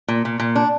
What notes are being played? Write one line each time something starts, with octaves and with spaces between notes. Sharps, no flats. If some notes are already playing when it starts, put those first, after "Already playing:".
A#2
A#2
A#2
D4